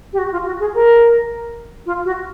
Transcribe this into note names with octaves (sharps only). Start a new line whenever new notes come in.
G4
F#4
F4
F#4
G#4
A#4
F4
F#4